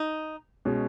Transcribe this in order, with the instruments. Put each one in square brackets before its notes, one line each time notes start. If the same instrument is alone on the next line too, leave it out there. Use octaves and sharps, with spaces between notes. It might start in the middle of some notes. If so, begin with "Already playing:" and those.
Already playing: [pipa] D#4
[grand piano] B2 G#3 C#4